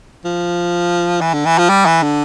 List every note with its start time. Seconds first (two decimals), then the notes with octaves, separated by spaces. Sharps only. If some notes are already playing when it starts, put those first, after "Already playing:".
0.25 F3
1.21 E3
1.33 D3
1.46 E3
1.58 F3
1.69 G3
1.86 E3
2.02 D3